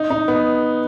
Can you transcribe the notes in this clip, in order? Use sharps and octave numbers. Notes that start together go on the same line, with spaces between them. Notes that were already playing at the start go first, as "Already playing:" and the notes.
Already playing: D#4
D#4
B3